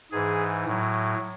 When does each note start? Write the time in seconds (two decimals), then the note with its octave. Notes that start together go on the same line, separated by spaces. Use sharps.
0.12 G#2 E3 G#4
0.65 A2 F#3